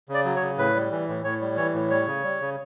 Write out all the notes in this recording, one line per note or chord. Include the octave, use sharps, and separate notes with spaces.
C#3 D5
F#3
C#5
C#3
A2 B4
G3
E3
A2
A2 C#5
G3
E3 C#5
A2
G3 C#5
C#3
G3
C#3